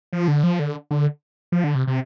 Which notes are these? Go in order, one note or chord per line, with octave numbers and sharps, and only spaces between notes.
F3
D3
F3
D3
D3
F3
D3
C3
C3